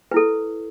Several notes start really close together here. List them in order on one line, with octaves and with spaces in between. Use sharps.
B4 E4 A4